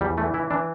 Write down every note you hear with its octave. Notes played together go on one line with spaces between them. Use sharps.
E2 G3
E3 A3
E3 E4
E3 D4